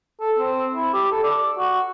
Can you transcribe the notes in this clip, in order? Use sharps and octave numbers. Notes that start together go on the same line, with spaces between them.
A4
C4
E4
G4
A4
D5
F#4